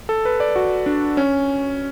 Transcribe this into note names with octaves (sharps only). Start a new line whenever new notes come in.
A4
B4
D5
F#4
D4
C#4